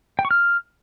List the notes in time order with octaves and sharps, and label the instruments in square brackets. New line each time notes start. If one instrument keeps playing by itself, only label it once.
[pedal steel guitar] G5
C#6
F6